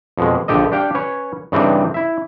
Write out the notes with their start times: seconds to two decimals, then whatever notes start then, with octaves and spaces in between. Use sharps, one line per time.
0.18 F2 B2 G#3
0.48 A#1 D3 G4 A4 D#5
0.72 D4 G4 F5 G5
0.95 C#4 B4 C#5
1.52 G2 C#3 E3 C4 D4 D#4
1.94 E4 E5